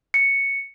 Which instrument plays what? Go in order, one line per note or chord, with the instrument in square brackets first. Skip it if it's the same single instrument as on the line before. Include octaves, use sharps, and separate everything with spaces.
[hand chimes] C#7